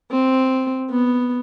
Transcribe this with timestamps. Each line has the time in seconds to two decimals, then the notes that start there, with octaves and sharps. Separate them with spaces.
0.12 C4
0.91 B3